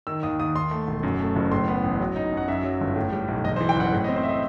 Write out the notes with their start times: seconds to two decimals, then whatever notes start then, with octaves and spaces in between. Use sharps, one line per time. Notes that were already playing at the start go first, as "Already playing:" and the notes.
0.07 D#3 E6
0.23 D#2 D#6
0.40 D#2 D#6
0.55 D#2 C6
0.71 A3
0.88 E1
1.03 F#2
1.20 A3
1.36 F#1
1.52 A2 C6
1.68 B3
1.84 A1
2.00 F#3
2.16 D#4
2.32 F#2
2.37 F#5
2.48 F#2 E5
2.64 F#3
2.81 G1
2.96 A2
3.12 G3
3.28 B1
3.44 E2 D#5
3.56 C5
3.60 E3
3.69 G5
3.76 F#1 F#5
3.93 A2
4.04 D#5
4.09 C4
4.16 C5
4.23 E5
4.29 D#5